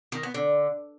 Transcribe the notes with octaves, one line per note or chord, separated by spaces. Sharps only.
D#3
B3
D3